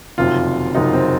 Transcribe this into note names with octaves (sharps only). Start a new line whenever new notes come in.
F#1 F2 C3 D#3 F#3 F4
F#1 F2 C3 D#3 F#3 D#4
C4